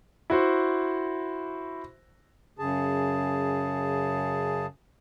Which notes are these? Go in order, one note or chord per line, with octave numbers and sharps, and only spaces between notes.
E4 F#4 C5
F#2 C#3 G#4 A5